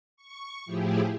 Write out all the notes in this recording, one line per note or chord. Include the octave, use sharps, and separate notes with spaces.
C#6
A2 F3 E4 G4 G#4